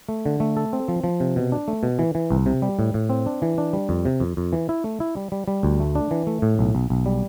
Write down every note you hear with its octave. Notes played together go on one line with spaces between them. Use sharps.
A3
D3
A3
A4
C4
F3
F3
C3
B2
D4
A3
B2
E3
E3
C2
C3
G3
A2
A2
C4
D4
E3
D4
G3
F2
C3
F2
F2
E3
E4
A3
E4
G3
G3
G3
D2
A3
D4
E3
A3
A2
B1
B1
B1
G3